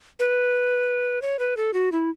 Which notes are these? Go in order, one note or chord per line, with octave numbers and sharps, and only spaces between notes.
B4
C#5
B4
A4
F#4
E4